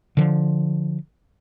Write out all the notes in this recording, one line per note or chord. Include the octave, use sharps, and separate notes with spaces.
D3 F3